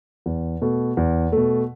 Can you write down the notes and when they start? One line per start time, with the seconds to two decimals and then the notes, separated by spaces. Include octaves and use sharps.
0.26 E2
0.62 B2 A3
0.97 E2
1.32 B2 A3